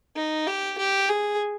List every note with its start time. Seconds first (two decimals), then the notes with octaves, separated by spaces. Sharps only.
0.16 D#4
0.47 G4
0.78 G4
1.09 G#4